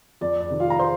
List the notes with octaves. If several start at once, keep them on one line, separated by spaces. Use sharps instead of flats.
F2 D5
D5
C3 D#3
F4 F5
A#5
C5 C6